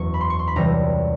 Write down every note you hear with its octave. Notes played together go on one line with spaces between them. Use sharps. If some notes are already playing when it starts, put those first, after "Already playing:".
Already playing: F#1 E2 E3 C#6
B5
C6
C#6
C6
B5
C#2 C3 E3 G3 A#5